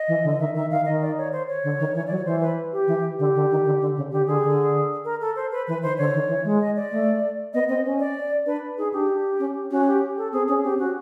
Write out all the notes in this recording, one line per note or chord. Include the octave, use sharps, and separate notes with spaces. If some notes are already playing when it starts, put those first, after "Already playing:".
Already playing: D#5
E3
D3
D#5
D#3 E5
D#3 E5
D#3 F5
D#3 D#5
D5
C#5
C5
C#5
D3
D#3
E3
F#3 D5
C#5
E3 C5
B4
G4
E3
D3 G4
D3
D#3
D3
D3
C#3
D3 G4
D3 G#4
D3
A#4
A4
C5
B4
E3 B4
D#3 C5
D3 C#5
D#3
E3
G#3
D#5
D5
A3
B3 D#5
C4 D#5
C#4
D5
D4 B4
D#4 G#4
D4 G4
C#4
C#4 F#4
G4
A4
C4 G#4
C#4 G#4
C4 G4
C#4 F#4